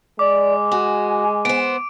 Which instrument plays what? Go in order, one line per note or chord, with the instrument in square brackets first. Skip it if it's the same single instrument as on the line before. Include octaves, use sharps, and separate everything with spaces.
[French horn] G#3 [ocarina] D5 [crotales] D6
[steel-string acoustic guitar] F#4 [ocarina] G#5
[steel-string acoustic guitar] B3 C5 [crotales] D7